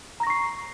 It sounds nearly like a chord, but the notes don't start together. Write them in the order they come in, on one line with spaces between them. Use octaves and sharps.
A#5 A#6 C#6 C7